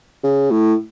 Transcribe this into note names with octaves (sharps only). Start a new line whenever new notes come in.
C#3
A2